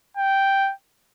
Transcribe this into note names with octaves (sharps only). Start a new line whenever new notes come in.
G5